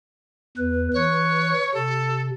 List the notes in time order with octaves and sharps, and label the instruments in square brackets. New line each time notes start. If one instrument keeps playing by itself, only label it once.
[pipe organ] E2 B4
[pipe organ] E3 F#6 [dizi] C#5
[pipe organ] C3 [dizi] A4